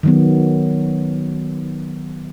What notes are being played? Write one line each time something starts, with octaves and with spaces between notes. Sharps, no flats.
D#3 F#3 B3